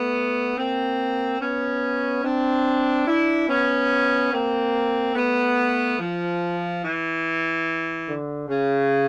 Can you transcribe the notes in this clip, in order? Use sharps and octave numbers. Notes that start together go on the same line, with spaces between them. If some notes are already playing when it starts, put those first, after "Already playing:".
Already playing: A3 B3
A#3 C4
B3 C#4
C4 D4
D4 E4
B3 C#4
A#3 C4
A3 B3
F3
E3
D3
C#3